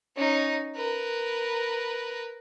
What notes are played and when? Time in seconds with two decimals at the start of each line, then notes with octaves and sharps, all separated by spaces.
0.16 C#4 D#4
0.76 A#4 B4